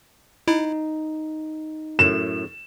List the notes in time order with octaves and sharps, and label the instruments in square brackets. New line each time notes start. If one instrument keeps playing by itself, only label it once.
[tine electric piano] D#4 [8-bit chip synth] E4
[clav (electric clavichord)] F#2 A2 [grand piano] E7